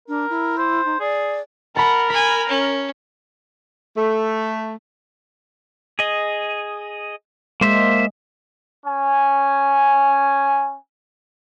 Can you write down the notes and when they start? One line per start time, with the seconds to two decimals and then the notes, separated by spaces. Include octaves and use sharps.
0.08 D4 A#4
0.30 E4
0.58 C5
0.85 D#4
1.00 G#4 D5
1.76 A#4 F#5 A5 B5
2.10 G#5 B5 B6
2.49 C#4
3.96 A3
5.99 G#4 D#5
7.61 G#3 A#3 C5 E5
8.86 C#4 G#5